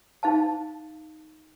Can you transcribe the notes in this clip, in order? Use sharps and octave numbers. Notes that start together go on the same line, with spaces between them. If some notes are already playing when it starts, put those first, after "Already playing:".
D#4 F5 A5